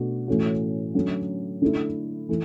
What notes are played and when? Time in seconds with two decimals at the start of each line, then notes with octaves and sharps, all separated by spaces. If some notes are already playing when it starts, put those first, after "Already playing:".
Already playing: B2 A3 D4 F#4
0.28 A2 E3 A3 C#4 F#4
0.95 D3 F#3 A3 C#4
1.62 D3 A3 E4
2.29 E3 A3